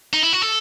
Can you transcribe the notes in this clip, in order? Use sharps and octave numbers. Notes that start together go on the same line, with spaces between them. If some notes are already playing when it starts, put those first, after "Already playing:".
D#4
E4
F#4
A4